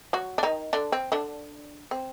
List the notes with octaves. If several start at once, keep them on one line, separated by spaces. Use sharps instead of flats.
F#3 F#4
D4
D#3 D#4
D3 D4
C4
D3 D4
C4